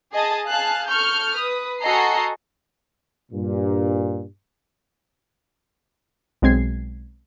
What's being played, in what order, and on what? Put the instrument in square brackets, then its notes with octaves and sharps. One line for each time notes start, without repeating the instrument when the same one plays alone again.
[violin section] G#4 D#5 A5
G#4 F5 A5 F#6
A4 C#6 F6 G6
B4 D#6
F#4 A4 D#5 G#5 A#5 C7
[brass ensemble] G2 A#2
[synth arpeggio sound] B1 G#3 C4 G#6 C7